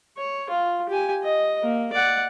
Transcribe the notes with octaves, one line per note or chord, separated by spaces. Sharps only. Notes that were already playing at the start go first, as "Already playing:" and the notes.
C#5
F4
G4 G#5
D#5
A#3
D5 F#5